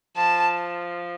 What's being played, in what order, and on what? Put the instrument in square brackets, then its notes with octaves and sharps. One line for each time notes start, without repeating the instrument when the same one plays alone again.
[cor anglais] F3 [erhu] A5